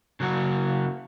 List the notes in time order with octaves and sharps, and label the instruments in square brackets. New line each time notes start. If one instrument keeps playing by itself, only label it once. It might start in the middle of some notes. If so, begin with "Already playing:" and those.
[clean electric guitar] C#3 F#3 A#3 F#4